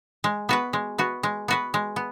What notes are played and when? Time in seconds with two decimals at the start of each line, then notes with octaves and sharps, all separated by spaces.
0.24 G#3
0.49 B3 F#4 B4
0.73 G#3
0.98 B3 F#4 B4
1.23 G#3
1.48 B3 F#4 B4
1.74 G#3
1.96 B3